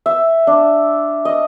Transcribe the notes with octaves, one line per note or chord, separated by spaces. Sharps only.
E5
D4
D#5